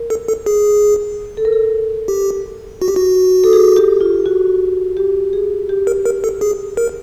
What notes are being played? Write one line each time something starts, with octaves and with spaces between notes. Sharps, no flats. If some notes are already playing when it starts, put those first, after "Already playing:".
Already playing: A#4
A4
A4
G#4
A4
A#4
A4
G4
F#4
G4
F#4
A4
G#4
G4
F4
F#4
G4
G#4
G4
A#4
A#4
A4
G#4
A#4